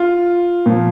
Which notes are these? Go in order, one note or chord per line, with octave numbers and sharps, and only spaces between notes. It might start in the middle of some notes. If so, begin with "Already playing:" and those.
Already playing: F4
A#2 F3